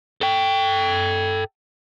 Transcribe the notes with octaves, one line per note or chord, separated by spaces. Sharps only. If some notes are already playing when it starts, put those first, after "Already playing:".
A4 G5